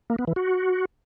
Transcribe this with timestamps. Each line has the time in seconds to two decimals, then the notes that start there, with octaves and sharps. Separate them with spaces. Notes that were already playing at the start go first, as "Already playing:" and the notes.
0.10 A#3
0.19 B3
0.27 E3
0.36 F#4